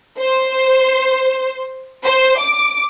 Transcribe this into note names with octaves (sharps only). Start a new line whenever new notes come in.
C5
C5
D6